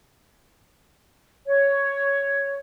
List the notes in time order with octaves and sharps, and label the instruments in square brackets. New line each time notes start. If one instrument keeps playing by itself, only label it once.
[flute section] C#5